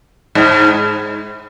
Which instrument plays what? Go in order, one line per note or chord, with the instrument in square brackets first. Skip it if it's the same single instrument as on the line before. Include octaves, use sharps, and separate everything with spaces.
[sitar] G#2